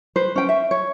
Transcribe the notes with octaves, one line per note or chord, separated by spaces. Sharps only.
B4 C5
C#4 G5
E5
C#5